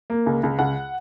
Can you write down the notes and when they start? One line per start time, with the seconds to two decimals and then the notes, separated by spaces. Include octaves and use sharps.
0.10 A#3
0.26 C#2
0.43 C#2
0.59 C#2 F#5